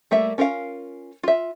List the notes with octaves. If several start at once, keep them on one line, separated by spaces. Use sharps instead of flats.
G3 A3 A#3 E5
C#4 F4 A#4 B4 F5
F4 E5